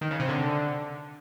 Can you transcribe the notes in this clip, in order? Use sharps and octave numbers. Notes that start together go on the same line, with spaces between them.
D#3
C#3
C3
D3